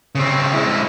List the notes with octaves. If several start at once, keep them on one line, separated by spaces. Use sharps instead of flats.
C#3 C4
G#3 E4